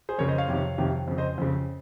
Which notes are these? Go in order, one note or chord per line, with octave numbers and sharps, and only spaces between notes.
G#4 C5
F2 C#3 A#4 C#5
C5 D#5
C#5 F5
F2 C3 D#3
F2 C3 D#3
F2 C#3
C5 D#5
F2 C#3